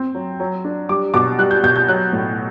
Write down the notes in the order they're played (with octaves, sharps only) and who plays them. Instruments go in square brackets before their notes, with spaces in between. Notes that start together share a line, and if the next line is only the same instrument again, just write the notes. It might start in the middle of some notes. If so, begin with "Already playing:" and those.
Already playing: [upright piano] C4
F#3
F#3
D4
G3 D6
B2 D6
G3 F#6
G6
B2 G6
G6
F#3 F#6
A2